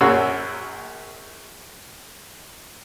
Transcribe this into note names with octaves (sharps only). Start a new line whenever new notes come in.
A#1 F#2 C#4 F#4 E6